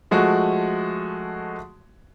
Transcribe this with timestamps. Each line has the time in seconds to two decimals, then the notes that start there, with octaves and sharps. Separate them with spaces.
0.11 F3 G#3 A3 F#4